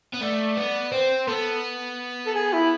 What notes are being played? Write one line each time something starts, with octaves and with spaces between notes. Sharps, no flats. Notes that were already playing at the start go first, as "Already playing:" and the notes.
B3
A3 D5
B3
C4 C5
B3 A4
A4
G#4
E4